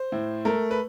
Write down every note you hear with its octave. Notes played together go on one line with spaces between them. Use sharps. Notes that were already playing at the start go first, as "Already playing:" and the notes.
Already playing: C5
A2
A3 A#4
B4